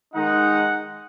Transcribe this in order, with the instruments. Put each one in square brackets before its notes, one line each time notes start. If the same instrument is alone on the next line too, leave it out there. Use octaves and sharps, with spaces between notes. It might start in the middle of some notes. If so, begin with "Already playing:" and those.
[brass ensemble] D#3 G#3 D#4 F#5